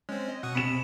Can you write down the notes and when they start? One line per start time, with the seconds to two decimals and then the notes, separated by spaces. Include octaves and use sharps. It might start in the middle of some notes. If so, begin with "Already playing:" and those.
0.09 G#3 C4 C#4
0.29 D#5
0.43 B2 F#5 C#6 D#6
0.55 C3 B5 C#7 E7